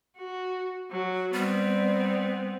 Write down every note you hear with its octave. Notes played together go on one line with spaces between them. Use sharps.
F#4
F#3
G3 B3 C4